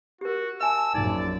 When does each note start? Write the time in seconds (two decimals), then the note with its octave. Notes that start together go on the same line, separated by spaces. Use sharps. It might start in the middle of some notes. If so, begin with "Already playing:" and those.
0.21 F#4 G4 A#4
0.61 E5 G#5 A5 E6
0.95 A#1 F#2 D#4 D5